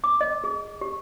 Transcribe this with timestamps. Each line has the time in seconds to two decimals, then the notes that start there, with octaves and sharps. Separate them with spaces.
0.04 D6
0.21 D#5
0.44 G#4
0.81 G4